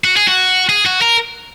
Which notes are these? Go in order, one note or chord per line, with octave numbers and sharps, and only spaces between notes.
F#4
G#4
F#4
G#4
F#4
A#4